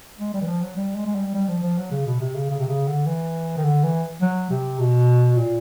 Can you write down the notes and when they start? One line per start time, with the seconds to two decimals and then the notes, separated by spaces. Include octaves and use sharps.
0.19 G#3
0.34 G3
0.41 E3
0.48 F3
0.62 F#3
0.76 G3
0.96 G#3
1.06 G#3
1.15 G3
1.34 G3
1.48 F3
1.63 F3
1.78 F#3
1.91 C#3
2.06 B2
2.20 C3
2.35 C#3
2.50 C#3
2.59 C3
2.69 C#3
2.88 D3
3.06 E3
3.57 D#3
3.64 D3
3.84 E3
4.21 F#3
4.50 C3
4.79 B2
5.37 A#2